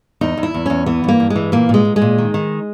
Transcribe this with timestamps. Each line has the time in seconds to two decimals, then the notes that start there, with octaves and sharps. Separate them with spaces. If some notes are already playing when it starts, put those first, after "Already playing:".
0.21 E2 D#4
0.37 E2
0.43 E4
0.54 E2
0.66 E2 C#4
0.86 E3 B3
1.04 G2 A#3
1.20 G2
1.30 G#3
1.36 E3
1.52 A#2 A#3
1.69 A#2 G#3
1.85 A#2
1.96 G#3
2.02 A#2
2.18 D#3
2.34 D#3